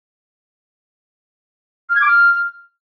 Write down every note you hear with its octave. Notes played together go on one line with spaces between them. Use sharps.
F6
G#6
D6
F6